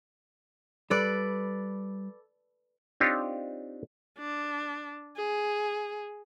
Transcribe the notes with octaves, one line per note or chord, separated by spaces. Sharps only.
G3 A4 B4 D5
C4 D4 D#4 F4 G4 C#5
D4
G#4